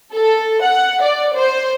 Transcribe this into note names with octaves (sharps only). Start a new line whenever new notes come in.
A4
F#5
D5
C5